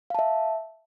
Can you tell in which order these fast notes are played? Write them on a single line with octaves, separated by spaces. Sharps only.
F5 A5 E5